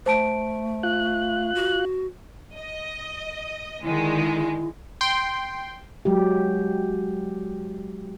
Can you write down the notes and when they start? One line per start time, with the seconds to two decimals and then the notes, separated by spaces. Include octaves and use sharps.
0.06 A3 C5 A5 D7
0.83 F4 F#6
1.55 F#4
2.55 D#5
3.83 D3 D#3 G#3 E4
5.01 G5 C6
6.05 F#3 G#3 G4